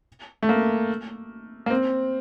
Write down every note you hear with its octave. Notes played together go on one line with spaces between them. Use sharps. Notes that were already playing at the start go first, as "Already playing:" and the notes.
A3
A#3
A#3
C4